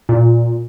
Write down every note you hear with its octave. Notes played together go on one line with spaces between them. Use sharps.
A#2